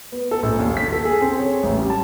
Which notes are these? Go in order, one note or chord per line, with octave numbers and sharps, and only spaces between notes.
B3
A4
A#1
D#2
B6
A4
G#4
C4
C#5
A1
G3
A5